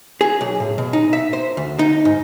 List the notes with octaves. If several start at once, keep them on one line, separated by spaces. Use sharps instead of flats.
G#4
B1
A2
B2
D#4
E5
C5
D2
D#4
G#2